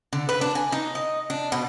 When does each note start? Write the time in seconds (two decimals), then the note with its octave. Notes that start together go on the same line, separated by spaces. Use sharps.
0.13 D3
0.29 B4
0.41 D4
0.55 G#5
0.72 D#4
0.95 D#5
1.30 D4
1.52 B2